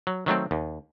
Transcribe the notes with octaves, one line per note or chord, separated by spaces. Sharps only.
F#3
D#3 F#3 A3 C4
D#2